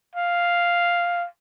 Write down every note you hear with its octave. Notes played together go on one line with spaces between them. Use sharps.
F5